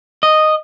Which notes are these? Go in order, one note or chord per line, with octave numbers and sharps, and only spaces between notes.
D#5